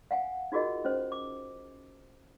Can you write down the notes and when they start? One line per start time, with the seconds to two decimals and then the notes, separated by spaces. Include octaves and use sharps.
0.11 F5 F#5 G#5
0.52 D#4 F4 F#4 G#4 A#4 D#5
0.85 C#4 C5
1.12 D6